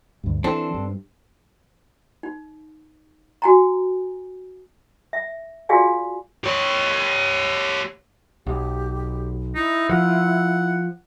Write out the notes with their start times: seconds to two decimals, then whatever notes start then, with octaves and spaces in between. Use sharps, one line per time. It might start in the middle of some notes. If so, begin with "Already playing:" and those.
0.24 D2 G2
0.44 E3 C4 D4 A4
0.74 G2
2.23 D#4
3.42 F#4 G#5 A#5
5.13 E5
5.69 F4 F#4 G#4 D5 F5 G#5
6.44 G4 C#5
8.47 B1 G4
9.55 D#4 E4
9.89 F3 F#5